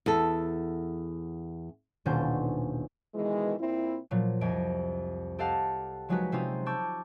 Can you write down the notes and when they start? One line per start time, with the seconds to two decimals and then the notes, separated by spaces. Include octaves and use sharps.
0.06 E2 A4
2.05 D#1 B2 C#4 D4 C5 G6
3.15 B2 D#3 E3 G#3
3.59 A#2 C4 E4
4.11 A#2 F3 F#3
4.41 C2 F2 D#5 G#6 D7
5.39 G4 A4 D#5 F5 F#5 A5
6.09 F3 F#3 G#3 D#4 F#4 B4
6.32 C3 C4 C#4 D#4 F4 D#6
6.66 A5 C#6 D6 E6 G6